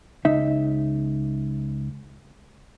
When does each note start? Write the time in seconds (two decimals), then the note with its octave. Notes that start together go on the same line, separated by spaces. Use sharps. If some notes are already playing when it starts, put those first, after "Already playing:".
0.25 C#2 D#4 E5